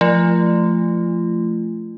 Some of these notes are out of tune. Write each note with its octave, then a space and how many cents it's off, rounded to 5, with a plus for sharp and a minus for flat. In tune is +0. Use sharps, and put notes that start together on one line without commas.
F3 -5 A3 +0 F4 -35